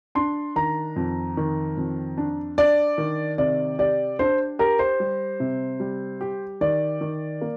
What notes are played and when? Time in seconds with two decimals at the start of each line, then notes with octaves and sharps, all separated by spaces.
0.15 D4 C6
0.56 D#3 A#5
0.96 F2
1.37 D#3
1.77 F2
2.17 D4
2.58 D4 D5
2.98 D#3
3.38 C3 D5
3.79 G4 D5
4.19 D4 C5
4.59 G4 A#4
4.79 C5
5.00 G3
5.40 C3
5.80 G3
6.21 G4
6.61 D#3 D5
7.01 D#3
7.41 A#3